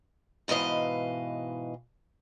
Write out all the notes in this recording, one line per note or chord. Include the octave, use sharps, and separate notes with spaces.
G#2 B2 E3 D#5 F5